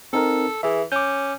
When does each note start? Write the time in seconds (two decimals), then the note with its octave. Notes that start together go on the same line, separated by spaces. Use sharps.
0.13 C4 D#4 A4 A#4
0.63 E3 G#4 E5
0.92 C#4 D6 G6